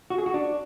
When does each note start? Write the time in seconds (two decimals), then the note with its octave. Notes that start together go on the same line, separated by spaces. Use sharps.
0.10 F#4
0.18 G#4
0.26 F#4
0.34 D4